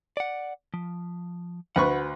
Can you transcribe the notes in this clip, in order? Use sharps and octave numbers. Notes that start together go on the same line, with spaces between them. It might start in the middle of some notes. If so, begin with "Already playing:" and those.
D5 F#5
F3
D2 B4 F#5 C#6